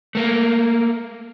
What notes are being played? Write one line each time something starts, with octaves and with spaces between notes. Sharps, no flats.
A3 A#3